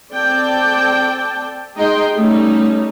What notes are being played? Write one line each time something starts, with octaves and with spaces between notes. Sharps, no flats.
C4 A4 D5 G5 A5
G#3 D#4 D#5 G5 C6
G3 A3 C#4 D#4